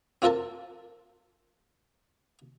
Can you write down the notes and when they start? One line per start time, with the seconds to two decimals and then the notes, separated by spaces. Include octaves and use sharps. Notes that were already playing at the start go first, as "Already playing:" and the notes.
0.22 C4 F4 A4 A#4 A5